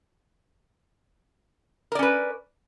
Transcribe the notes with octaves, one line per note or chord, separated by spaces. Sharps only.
C#4 A#4 B4 D5